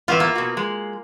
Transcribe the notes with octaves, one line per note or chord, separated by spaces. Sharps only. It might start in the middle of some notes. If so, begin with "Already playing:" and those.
E2 B3 F4 E5
A#3
B2 F#4
G#3